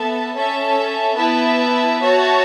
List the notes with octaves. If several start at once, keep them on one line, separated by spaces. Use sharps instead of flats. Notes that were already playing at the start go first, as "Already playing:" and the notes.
Already playing: B3 A4 E5 A5
C#4 A4 E5 A5
B3 E4 B4 E5 A5
F#4 C#5 E5 A5